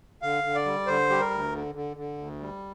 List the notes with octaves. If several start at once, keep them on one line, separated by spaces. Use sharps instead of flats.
D3 F5
D3
D5
G3
D3 C5
G3 G4
A#4
D2
D3
D3
D3
D2
G3